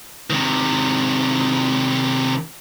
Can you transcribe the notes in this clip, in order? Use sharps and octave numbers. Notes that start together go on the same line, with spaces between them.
C3 D#3